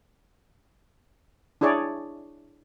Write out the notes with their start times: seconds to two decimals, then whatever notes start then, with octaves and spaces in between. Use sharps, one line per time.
1.61 D4 E4 G#4 C#5 D5